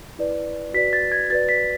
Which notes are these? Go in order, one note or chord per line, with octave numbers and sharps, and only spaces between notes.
E4 B4 D5
F#4 B4 D5 B6
A6
G#6
F#4 B4 D5 A6
B6